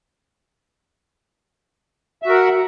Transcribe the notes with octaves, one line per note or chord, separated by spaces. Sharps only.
F#4 A#4 E5 F#5